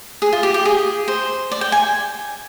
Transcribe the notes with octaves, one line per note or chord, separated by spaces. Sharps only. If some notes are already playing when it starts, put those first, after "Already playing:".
G#4
F4
G4
G4
G#4
C5
D5
G5
G#5